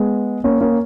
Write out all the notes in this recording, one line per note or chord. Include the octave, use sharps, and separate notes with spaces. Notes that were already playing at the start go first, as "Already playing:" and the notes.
Already playing: G#3 B3
A#3 C#4
A#3 C#4